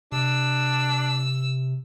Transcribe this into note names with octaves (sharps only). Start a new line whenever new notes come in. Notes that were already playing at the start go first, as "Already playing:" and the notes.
C3 D4 E6